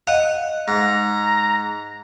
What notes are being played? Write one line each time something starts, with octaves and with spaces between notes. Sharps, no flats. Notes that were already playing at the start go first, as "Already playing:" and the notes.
D#5 F5 F#5
G#2 A#5